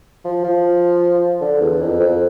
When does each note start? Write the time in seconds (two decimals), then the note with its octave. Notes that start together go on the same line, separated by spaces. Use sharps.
0.25 F3
0.44 F3
1.41 D3
1.61 E2
1.81 F2
2.00 F2